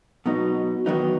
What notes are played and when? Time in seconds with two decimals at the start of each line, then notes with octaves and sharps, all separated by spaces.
0.26 B2 F#3 B3 D#4
0.86 E2 D#3 F#3 B3 D#4